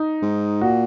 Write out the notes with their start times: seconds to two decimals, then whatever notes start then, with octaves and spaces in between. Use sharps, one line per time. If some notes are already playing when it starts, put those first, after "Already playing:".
Already playing: D#4
0.22 G#2
0.61 A#2 F#4